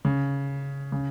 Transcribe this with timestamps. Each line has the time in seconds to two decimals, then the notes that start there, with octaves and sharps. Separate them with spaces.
0.05 C#3
0.92 C#3